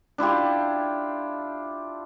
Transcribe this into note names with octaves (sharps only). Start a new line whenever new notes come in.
D4 E4 F4 G4